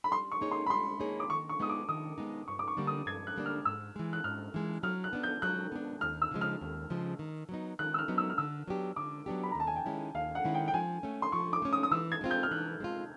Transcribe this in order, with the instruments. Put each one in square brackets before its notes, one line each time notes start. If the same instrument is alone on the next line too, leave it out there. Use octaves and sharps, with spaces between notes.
[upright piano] B5
[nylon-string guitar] G3 [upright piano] C6
[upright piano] C#6
[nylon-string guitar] A#3 D#4 G#4 C#5
[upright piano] C6
B5
[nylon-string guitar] G3 [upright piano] C6
[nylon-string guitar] A#3 D#4 G#4 C#5
[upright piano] D6
[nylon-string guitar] D#3 [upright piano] C#6
[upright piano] C#6
[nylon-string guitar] G#3 B3 D#4 [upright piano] D#6
[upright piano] D6
[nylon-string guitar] D#3 [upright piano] D#6
[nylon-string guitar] G#3 B3 D#4
[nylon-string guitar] G2 [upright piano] C#6
[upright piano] D6
C#6
[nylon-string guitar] D3 G3 A#3 D4
[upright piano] D#6
[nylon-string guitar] G2 [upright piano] G#6
[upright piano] F#6
[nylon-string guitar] D3 G3 A#3 D4
[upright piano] F6
[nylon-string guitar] G#2 [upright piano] E6
[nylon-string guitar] E3 G#3
[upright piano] F#6
[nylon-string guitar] G#2 [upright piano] F6
[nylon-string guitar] E3 G#3
[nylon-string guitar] F#3 [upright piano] F6
[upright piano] F#6
[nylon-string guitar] B3 D4
[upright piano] G6
[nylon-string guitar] F#3 [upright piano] F#6
[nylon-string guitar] B3 D4
[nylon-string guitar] D#2 [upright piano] F6
[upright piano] E6
[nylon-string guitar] C#3 F3 G#3
[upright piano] F6
[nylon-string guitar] D#2
C#3 F3 G#3
D#3
F#3 B3 D#4
[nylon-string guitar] D#3 [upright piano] F#6
[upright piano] E6
F6
[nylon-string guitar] F#3 B3 D#4
[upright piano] E6
F6
[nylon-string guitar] D3 [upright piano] E6
[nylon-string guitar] F#3 B3 D4 G4
[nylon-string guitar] D3 [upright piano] D6
[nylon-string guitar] F#3 B3 D4 G4
[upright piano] B5
A#5
[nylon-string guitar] D#2 [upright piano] A5
[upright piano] G#5
G5
[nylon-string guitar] D#3 G#3 C#4 E4
[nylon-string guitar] D#2 [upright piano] F5
[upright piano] F#5
[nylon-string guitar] D#3 G#3 C#4 E4
[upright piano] G5
G5
[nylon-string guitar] F3 [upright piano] G#5
[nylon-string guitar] A3 C#4
[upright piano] C6
[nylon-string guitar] F3 [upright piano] C#6
[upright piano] D6
[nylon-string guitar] A3 C#4
[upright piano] D#6
D#6
[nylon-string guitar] E3 [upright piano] E6
[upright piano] G#6
[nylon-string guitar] G#3 C4 F4
[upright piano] G6
F6
[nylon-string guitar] E3 [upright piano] F#6
[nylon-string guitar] G#3 C4 F4